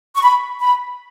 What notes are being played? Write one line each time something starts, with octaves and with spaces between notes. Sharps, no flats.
C#6
B5
B5